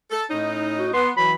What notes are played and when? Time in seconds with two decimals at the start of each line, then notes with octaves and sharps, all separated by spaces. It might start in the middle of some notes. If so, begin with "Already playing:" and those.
0.11 A4
0.30 A2 C#4 D#4
0.78 F#4
0.93 B3 C6
1.17 E3 F#3 B5